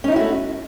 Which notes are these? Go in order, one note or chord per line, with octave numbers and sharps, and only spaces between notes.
A3 C#4 D#4 E4 F#4